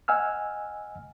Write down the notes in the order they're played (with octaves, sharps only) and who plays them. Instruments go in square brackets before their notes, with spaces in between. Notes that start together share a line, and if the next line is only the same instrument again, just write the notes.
[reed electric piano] D#5 F#5 G#5 E6 F6